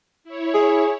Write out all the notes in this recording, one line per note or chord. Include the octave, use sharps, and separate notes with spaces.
E4 C#5
G#4